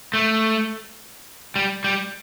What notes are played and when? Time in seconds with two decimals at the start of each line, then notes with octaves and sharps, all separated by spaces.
0.13 A3
1.56 G3
1.84 G3